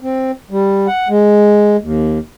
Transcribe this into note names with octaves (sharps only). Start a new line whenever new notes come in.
C4
G3
F#5
G#3
D#2